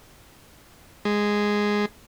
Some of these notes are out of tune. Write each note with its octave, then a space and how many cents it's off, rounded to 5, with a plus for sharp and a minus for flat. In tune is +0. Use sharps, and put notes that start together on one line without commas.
G#3 -5